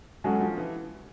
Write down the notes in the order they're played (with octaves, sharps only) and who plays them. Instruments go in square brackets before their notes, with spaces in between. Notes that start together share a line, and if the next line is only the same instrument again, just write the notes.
[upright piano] F#3 [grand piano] G#3 C#4 F#4 A4
[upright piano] F3
E3